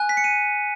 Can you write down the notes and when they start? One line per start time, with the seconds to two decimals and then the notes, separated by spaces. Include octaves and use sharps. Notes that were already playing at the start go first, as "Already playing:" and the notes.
Already playing: G#5 F#6
0.09 B6
0.17 C#7
0.24 D#7